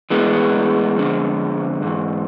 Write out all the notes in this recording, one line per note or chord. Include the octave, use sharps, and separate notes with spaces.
A2 E3 G#3 B3
F2 D3
G#2 E3